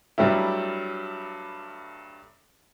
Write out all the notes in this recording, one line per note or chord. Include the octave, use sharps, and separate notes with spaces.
G2 F#3 G3 A3 E4